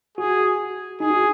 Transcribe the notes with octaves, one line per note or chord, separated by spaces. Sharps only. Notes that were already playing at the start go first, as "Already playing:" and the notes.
F#4 G#4
D#4 G#4
F#4